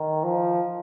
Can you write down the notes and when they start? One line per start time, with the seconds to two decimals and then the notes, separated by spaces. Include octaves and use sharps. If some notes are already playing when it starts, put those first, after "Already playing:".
Already playing: D#3
0.23 F3